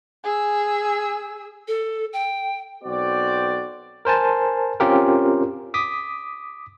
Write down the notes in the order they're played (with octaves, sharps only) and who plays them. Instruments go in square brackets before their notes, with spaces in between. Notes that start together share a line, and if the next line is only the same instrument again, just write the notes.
[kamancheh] G#4 E6
[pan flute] A4
G5
[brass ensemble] B1 C4 F#4 D5
[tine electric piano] A#4 C5 G#5 A5
C4 C#4 F4 G4 A#4
D6 D#6 B6